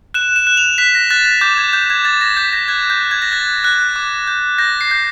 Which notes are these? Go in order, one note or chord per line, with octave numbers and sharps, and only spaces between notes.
F#6 E7
E7
F#6
F7
F#6 B6
A#6
F#6 A6
A6
D6 G6
G#6
G6
G#6
G6 A6
A#6
G6 B6
A#6
F#6 G#6
G6
F#6
G#6
A#6
F#6 A6
F#6
D6
G6
G6 A#6
C7
G6